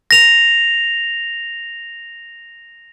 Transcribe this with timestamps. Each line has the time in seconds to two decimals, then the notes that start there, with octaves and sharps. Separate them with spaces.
0.11 A#6 F7